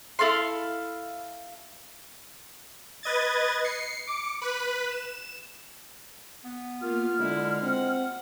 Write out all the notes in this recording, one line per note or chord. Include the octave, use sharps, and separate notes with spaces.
E4 A4 F5 C6
B4 D#5 G#6 A6
C7 C#7
D6 C#7
B4 F#6 B6
E7
B3
A#3 F4 F6
D3 G#3 E4
C4 F#5